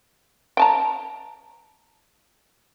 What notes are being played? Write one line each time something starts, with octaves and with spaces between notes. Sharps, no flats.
G5 A5 A#5